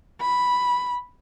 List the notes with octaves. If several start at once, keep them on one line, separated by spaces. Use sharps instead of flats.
B5